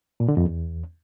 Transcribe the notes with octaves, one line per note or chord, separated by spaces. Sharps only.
A#2
D3
F2
E2